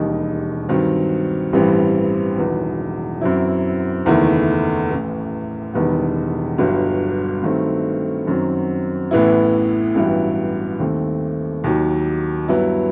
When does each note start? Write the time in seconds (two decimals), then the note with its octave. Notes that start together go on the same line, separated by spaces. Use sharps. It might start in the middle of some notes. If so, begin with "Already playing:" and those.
Already playing: E1 D#2 D#3 G3 D#4
0.69 G2 D#3 F#3 C4
1.53 A1 G2 E3 G3 C4
2.37 E1 E2 D#3 F#3 B3
3.21 F#2 F#3 C4 E4
4.05 F#1 E2 D#3 A3 E4
4.90 A1 A2 E3
5.74 E1 E2 D#3 G3 B3
6.58 G1 G2 F#3
7.43 G2 D#3 F#3 A3 C4
8.27 F#2 D#3 F#3 C4
9.11 A1 A2 E3 B3 E4
9.95 A1 G2 F#3 B3 E4
10.80 D#2 D#3 A3 C4
11.64 D#2 D#3 F#3
12.48 G2 F#3 B3 E4